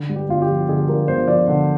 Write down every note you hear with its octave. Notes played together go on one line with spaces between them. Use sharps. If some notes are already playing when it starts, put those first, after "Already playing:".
Already playing: D3
G2
G4
G1 F4
G4
F3
D3 G#4
G2 A#4
G1 C5
F3 D5
D3